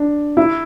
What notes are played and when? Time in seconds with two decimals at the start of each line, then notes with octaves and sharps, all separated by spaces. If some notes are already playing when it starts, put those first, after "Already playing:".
Already playing: D4
0.37 E4